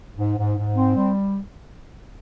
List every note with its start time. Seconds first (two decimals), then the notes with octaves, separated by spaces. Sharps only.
0.16 G#2
0.37 G#2
0.56 G#2
0.76 C4
0.96 G3